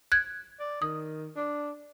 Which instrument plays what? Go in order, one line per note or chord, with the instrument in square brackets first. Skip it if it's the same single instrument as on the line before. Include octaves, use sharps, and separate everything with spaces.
[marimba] F#6 G#6
[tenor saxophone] D5
[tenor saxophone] D#3 [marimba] D#6
[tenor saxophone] D4